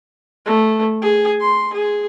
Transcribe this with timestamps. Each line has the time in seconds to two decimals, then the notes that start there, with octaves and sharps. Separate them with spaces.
0.45 A3
1.02 G#4
1.40 C6
1.73 G#4